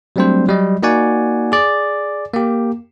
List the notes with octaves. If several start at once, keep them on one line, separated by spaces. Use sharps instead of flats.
F#3 G3 A3 C4 D4 C5
F#3 G3 D#5
A#3 D#4 F#4 D5 F#5 G#5
G#4 D5
A#3 G4